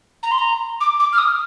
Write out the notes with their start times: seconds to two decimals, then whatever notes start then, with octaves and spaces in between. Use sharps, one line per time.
0.23 A#5
0.31 C6
0.39 A#5
0.81 D6
1.00 D6
1.13 F6
1.18 D#6